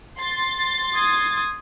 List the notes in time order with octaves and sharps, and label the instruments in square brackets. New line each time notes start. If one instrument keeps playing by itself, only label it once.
[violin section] C6 A6
[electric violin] D#6 G#6